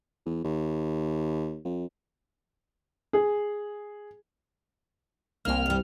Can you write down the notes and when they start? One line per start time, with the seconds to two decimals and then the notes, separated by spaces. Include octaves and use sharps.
0.26 E2
0.44 D#2
1.65 F2
3.13 G#4
5.45 C2 A#3 G5 F6
5.66 G2 G3